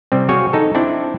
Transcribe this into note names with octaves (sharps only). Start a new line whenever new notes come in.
C3 G3 C4
F#4 G#4 C#5 F5 G5 G#5
D#4 A4
C4 D4 E4 D5